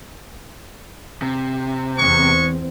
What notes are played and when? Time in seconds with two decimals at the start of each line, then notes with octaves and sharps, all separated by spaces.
1.22 C3
1.98 E2 G#3 C4 C#6